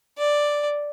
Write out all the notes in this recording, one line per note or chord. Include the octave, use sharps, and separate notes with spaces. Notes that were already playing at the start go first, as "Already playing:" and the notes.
D5